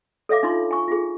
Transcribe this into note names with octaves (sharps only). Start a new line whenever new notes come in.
A4 C#5 E5 F5 D6
D4 D#4 F4 C6
G#5 C#6
F4 G#4